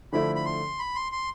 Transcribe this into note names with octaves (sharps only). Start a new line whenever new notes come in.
D3 F3 A3 E4 B5
B5
C6
B5
C6
C6